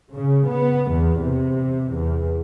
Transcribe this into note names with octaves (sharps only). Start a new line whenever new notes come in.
C#3
B3
E2
C3
E2